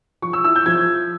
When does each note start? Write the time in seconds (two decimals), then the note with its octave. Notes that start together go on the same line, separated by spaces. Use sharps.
0.22 F3 C#6
0.33 E6
0.44 E4 E6
0.56 G6
0.66 F3 G#6